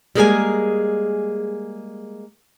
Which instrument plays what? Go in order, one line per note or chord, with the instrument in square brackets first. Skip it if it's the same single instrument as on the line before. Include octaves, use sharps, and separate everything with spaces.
[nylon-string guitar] G3 G#3 A#3 G#4 A#4 G#5